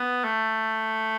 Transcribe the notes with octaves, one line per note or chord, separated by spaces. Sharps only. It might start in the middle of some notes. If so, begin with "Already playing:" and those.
Already playing: B3
A3